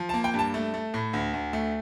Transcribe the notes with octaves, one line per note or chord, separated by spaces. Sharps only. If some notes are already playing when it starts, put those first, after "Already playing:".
Already playing: F3
A#3 A5
G5
G2 A5
A3
A3
A2
D2
D2
A3